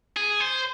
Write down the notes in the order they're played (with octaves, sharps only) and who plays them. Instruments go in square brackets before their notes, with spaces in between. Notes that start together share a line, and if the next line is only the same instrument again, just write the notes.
[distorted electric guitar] G#4
C5